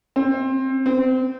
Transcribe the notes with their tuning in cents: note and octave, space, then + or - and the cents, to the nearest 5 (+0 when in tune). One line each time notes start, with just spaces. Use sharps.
C4 +20
C4 -25